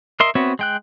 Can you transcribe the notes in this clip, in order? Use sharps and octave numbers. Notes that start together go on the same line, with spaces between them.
A#4 D#5 E5 C6
B3 C4 F#4 C#5 E5
G#3 G5 F#6